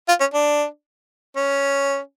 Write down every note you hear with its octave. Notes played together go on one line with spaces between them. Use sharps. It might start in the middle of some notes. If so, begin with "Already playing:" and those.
F4
C#4
D4
C#4